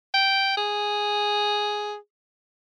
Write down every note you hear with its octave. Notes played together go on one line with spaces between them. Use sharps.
G5
G#4